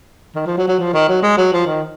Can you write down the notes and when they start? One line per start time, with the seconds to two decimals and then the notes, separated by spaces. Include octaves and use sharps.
0.36 D#3
0.47 F3
0.57 F#3
0.68 F#3
0.80 F3
0.94 D#3
1.08 F#3
1.23 G#3
1.38 F#3
1.53 F3
1.67 D#3